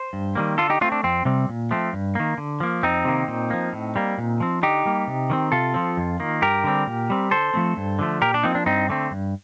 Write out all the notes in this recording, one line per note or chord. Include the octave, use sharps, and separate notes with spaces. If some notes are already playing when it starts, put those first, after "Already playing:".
Already playing: C5
G2
D#3 G3 A#3
D3 F4 A4
D#4 G4
A3 C4 D4 F4
D4
F2 C4
C3 G3 C4
A#2
F3 A3 C4
G2
D#3 A#3
D3
F3 A#3
F2 C4 D#4
C3 D#3 A#3
A#2
F3 A#3
A2
G3 A#3
A#2
F3 C4
D3 D#4 G4
G3 A#3
C3
D#3 G3 C4
C3 F4 A4
F3 C4
F2
D#3 A#3
G2 G4 A#4
D3 G3 C4
A#2
G3 C4
D3 A4 C5
F3 A3 C4
G2
D3 F3 A3
A#2 G4 A#4
D4
F3 A#3 C4 D#4
D4
G2 C4 D#4
D3 A3 C4
G2